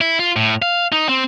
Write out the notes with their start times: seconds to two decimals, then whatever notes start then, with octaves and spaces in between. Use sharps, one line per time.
0.01 E4
0.19 F4
0.36 A2
0.62 F5
0.92 D#4
1.09 C4